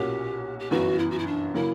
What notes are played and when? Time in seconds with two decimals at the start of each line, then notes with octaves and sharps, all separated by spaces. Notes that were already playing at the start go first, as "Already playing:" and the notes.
Already playing: B1 A#2 A#3 C#4 F#4 G4
0.59 G4
0.71 G1 F#2 E3 B3 F#4
0.99 E4
1.10 F#4
1.18 E4
1.26 D4
1.54 C#3 F#3 A#3 E4